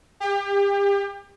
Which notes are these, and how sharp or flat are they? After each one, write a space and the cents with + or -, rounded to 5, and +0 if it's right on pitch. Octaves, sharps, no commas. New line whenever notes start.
G4 +35